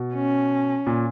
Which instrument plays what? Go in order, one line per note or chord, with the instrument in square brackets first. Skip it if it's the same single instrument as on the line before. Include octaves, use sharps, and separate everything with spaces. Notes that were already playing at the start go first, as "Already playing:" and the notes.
Already playing: [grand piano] B2
[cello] C#4
[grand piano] A#2